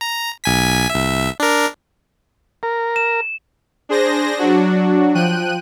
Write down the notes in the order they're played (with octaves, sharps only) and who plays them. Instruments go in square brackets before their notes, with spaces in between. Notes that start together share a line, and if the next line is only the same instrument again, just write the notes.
[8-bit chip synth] A#5
B1 G#5 B6
C2 E5
D4 A#4
[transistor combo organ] A#4
[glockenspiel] E7
[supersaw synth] D4 G#4 C5 A#6
F#3 D4 F#4
F3 G5 F#6 D#7